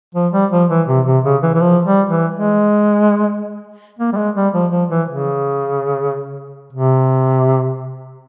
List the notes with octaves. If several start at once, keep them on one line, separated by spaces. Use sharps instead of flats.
F3
G3
F3
E3
C3
C3
C#3
E3
E3
F3
G3
E3
G#3
A#3
G3
G#3
G3
F3
F3
E3
C#3
C3